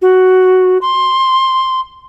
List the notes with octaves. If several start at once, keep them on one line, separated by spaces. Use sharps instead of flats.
F#4
C6